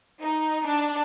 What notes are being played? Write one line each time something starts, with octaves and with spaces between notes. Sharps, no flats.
D#4
D4